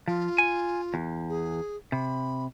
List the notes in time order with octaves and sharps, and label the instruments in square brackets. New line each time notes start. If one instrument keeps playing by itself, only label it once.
[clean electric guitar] F3 [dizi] F4
[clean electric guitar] G#5
E2
[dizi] G#4
[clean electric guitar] C3 [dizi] B5